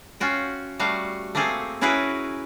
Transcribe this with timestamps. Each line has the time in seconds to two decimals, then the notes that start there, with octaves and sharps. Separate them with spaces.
0.20 C#4 F4 F#4 G5
0.79 G3 A3 F#4 F5
1.35 A3 A#3 C4 G#4 A4
1.81 C#4 E4 F#4 G#4 A#4 B4